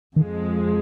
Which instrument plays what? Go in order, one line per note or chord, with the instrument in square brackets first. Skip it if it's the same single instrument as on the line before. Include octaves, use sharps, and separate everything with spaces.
[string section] F2 F3 G#3 [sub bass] D#3